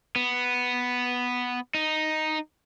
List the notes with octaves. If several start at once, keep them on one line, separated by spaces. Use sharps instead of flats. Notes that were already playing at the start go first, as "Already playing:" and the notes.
B3
D#4